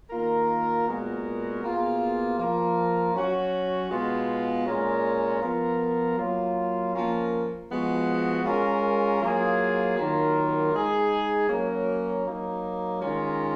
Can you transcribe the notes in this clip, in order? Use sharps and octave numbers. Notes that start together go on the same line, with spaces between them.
D#3 A#3 F4 A#4
A#2 G#3 B3 F#4 A#4
B2 A#3 F4 G#4
F3 A#3 F4 A#4
F#3 C#4 F#4
B2 G#3 B3 F4
A#2 G#3 C#4 F4 A#4
F3 B3 F4 A#4
F#3 A#3 F4
F3 A#3 C#4 F4 A#4
F3 G#3 B3 F#4
G#3 C#4 F4 A#4
F#3 A#3 F4 G#4
D#3 F#3 A#3 F4 A#4
G#3 D#4 G#4
F#3 A#3 C#4 F#4 A#4
F#3 A#3 D#4
D#3 G#3 C#4 F4 A#4